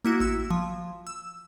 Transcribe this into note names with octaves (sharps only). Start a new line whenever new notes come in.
A#3 E4 F#4
A1 E6
F3
E6